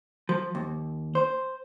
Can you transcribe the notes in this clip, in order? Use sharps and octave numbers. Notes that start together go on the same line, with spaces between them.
F3
D#2
C5